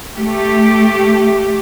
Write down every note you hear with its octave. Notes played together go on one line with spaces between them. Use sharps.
A3 G4